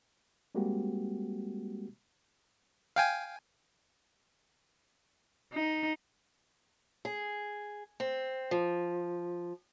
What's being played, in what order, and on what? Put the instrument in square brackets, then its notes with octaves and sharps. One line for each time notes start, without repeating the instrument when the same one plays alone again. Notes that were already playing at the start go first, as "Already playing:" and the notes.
[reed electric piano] G3 G#3 A#3 C4 F#4 G4
[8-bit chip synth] F5 G5 G#5
[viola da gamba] D#4
[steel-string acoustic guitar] G#4
C4
F3